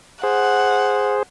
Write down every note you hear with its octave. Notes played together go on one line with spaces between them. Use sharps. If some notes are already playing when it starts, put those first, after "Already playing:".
G#4 C5 F#5